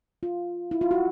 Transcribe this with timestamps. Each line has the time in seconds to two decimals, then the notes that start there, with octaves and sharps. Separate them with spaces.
0.23 F4
0.71 E4
0.81 F4
0.91 F#4